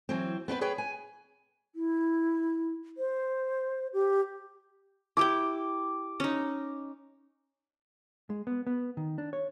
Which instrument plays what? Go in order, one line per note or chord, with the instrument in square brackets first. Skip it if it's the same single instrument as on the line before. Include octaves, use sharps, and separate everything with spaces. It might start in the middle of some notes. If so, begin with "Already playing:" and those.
[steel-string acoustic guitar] E3 F#3 C4
B3 C4 E4 B4
G#4 B4 C#5 G5
G#5
[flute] E4
C5
G4
[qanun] E4 G4 G5 [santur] D6
[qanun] C#4 D#4
[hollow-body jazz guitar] G#3
B3
B3
D#3
D4
C#5